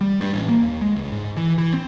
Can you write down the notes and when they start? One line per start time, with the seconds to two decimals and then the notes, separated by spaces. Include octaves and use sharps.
0.01 G3
0.21 G2
0.33 A1
0.48 A#3
0.63 D#2
0.81 G#3
0.96 C#2
1.12 G#2
1.37 E3
1.58 E3
1.74 C4